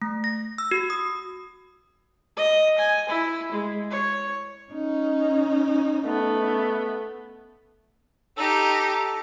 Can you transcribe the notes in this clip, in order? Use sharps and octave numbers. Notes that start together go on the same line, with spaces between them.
A3
A#6
E6
F#4
D#6
D#5
G#5
E4
G#3
C#5
C#4 D#4
A3 B3
D#4 G4 A4